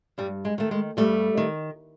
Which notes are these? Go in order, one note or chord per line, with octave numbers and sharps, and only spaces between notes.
G2 G3
G#3
D#3 A3
G#3
G2 G3 A3
D#3